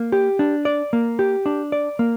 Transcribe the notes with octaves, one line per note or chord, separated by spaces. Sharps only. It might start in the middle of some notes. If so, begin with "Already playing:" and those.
Already playing: A#3
G4
D4
D5
A#3
G4
D4
D5
A#3